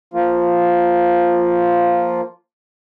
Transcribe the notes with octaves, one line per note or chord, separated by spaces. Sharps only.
F3 A#3 F4